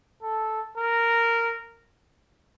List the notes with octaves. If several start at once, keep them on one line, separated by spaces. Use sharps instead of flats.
A4
A#4